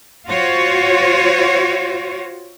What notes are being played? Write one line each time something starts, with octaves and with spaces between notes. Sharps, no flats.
F4 F#4 C5 C#5